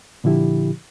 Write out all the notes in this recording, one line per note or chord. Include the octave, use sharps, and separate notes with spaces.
A#2 D3 F3 E4 G4